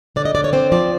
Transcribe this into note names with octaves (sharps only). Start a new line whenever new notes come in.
D3 D5
D#5
D3 D5
C#5
C4 C5
F3 D5